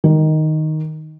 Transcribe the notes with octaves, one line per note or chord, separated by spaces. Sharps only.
D#3